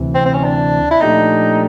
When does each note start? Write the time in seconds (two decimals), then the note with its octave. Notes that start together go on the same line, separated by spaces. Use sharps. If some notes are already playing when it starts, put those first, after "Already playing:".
Already playing: D2 C3 E3
0.15 C4
0.26 C4
0.34 C#4
0.44 D4
0.91 E4
1.01 A#2 F3 A3 D4 D#4 G4